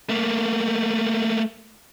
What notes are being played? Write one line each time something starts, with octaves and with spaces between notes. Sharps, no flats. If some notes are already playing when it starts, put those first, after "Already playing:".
A3 A#3